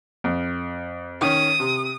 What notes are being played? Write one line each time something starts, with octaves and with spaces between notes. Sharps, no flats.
F2
D#3 C#4 D#6
C3